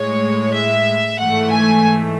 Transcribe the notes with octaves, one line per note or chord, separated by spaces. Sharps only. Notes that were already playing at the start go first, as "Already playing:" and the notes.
Already playing: A2 G#3 C#5
E5
G#2 E3 A3 F#5
G#5